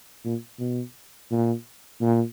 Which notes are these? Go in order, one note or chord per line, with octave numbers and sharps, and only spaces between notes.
A#2
B2
A#2
A#2